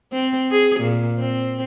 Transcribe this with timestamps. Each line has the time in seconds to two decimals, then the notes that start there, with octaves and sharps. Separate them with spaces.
0.12 C4
0.51 G#4
0.80 A#2
1.19 C4